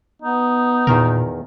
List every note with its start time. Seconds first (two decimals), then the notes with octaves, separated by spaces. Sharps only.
0.22 B3 D#4
0.87 E2 A#2 D#3 A#4